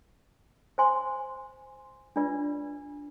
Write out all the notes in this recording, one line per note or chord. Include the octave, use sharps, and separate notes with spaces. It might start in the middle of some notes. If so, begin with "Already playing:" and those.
C5 G#5 C6
D4 F4 B4 D5